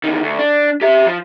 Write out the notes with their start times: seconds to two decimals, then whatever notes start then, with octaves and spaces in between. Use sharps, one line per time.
0.04 E2 D#3
0.23 D2
0.39 D4
0.81 G4 E5
1.06 F3